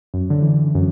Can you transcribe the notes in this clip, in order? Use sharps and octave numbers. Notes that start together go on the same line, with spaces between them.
F#2
D3
E3
F#2